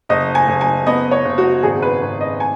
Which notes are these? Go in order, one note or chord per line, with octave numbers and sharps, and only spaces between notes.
F#1 D#5
G#5
F#1
G#5
B3 D#5
C#5
F#1
F#4
G#1 G#4
B4
G#1
D#5
G#5